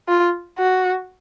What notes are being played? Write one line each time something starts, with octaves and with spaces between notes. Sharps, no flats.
F4
F#4